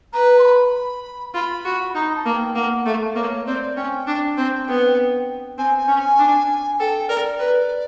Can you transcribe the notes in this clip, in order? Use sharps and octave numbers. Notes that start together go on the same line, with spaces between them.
B4 A#5
C6
B5
F4 B5
F#4
D#4 A#5
A5
A#3
G5
A#3 F#5
A3 F5
A#3 C#5
C4 D5
C#4 G5
D4
C4
B3
C4 G#5
G#5
C#4
G#5
D4
A4 G5
A#4 D5
B4